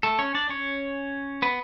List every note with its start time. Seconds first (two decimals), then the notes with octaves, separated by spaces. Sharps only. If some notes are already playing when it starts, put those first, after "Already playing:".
0.03 A3 A4
0.19 C#4 C#5
0.34 D4 D5
0.49 C#4 C#5
1.42 B3 B4